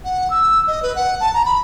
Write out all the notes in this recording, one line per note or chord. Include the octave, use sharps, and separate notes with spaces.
F#5
E6
D#5
B4
F#5
A5
A#5
B5